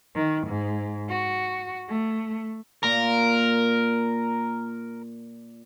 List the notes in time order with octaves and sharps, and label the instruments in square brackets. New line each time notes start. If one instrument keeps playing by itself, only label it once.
[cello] D#3
G#2
F#4
A3
[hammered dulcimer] A#2 [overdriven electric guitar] A#4